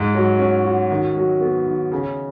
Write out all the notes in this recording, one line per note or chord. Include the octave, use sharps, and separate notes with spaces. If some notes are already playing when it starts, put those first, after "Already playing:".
Already playing: G#2
F#3
C#4
F#4
D#3
F#3
B3
D#3
C#3